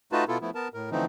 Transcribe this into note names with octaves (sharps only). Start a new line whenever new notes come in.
A3 D#4 F4 F#4 B4 A5
B2 B3 E4 F4 A4
F3 A3 B3 E4
B3 A#4 A5
A2 A#4
D3 E3 F3 A3 C4 D#4